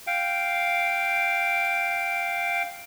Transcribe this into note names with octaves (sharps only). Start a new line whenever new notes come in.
F5 G5